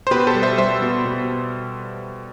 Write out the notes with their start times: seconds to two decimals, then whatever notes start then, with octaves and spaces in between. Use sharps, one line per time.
0.07 C5
0.11 B2 G4 B4
0.27 A4 C5
0.35 G3
0.43 C5 E5
0.58 G3 C5 E5
0.82 B2
1.05 B2